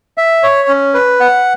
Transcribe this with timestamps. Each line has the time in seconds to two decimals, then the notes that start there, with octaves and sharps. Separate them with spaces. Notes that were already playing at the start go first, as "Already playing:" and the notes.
0.18 E5
0.43 C#5
0.68 C#4
0.94 B4
1.20 F#5